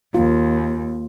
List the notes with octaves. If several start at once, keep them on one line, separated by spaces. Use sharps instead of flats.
D#2 A#3 F4